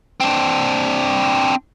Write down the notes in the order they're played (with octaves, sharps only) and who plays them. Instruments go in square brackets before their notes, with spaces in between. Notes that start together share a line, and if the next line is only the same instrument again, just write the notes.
[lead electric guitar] C4 D4